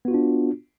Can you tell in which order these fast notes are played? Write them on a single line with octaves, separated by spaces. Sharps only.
B3 F#4 F4 D4